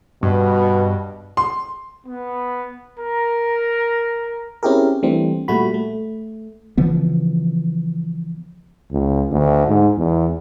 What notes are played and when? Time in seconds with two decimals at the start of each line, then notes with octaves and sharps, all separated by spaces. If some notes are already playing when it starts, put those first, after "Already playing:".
0.23 G2 B2
1.37 C6
2.07 B3
2.99 A#4
4.63 C4 C#4 E4 G4 G#4 A#4
5.03 E3 G3 A3 C4 D4
5.48 A#2 G3 A3 F#4 B5
5.74 A3
6.77 C#3 E3 F3 B3
8.91 C#2
9.31 D2
9.67 G#2
9.98 E2